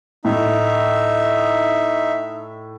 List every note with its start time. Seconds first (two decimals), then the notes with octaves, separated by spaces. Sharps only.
0.25 A2 D#4 E5